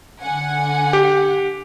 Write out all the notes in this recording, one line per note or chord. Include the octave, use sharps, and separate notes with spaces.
D3 F#5 G#5
G4